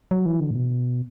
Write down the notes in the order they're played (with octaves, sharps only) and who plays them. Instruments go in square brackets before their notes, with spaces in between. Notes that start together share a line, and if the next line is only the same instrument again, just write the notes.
[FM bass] F#3
E3
D3
A2
B2